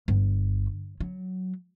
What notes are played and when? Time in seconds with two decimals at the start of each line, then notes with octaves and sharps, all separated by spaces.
0.08 G1
1.00 F#3